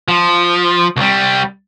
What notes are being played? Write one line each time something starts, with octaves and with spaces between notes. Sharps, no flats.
F3
C2 G3